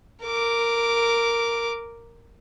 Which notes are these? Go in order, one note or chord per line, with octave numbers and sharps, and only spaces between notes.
A#4 D6